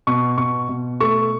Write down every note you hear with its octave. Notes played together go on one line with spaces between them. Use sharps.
B2 C#6
B2 C#6
B2
A3 C#6